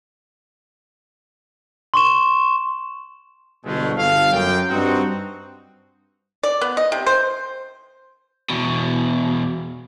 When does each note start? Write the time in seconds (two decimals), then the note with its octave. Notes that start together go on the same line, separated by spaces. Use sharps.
1.94 C6 C#6 E7
3.65 G1 B2 G#3 A3
3.98 G1 A4 F5
4.33 F#2 G5
4.70 G2 C4 D#4 F#4
6.43 D5
6.61 B3
6.77 D#5
6.92 C3
7.07 C5
8.50 E2 B2